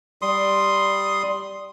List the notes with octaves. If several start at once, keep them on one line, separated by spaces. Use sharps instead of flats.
G3 C6 D#6